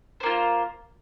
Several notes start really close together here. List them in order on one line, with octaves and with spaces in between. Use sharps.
C5 A#3 F4